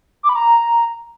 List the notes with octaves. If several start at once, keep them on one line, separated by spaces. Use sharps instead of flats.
D6
B5
A#5